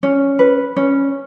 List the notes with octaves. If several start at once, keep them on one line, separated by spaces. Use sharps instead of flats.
C#4
B4
C#4